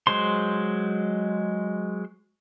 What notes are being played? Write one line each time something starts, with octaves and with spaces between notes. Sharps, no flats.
F#3 G#3 C5 C6